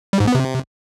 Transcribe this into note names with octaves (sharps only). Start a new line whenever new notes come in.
G3
G#2
B3
C3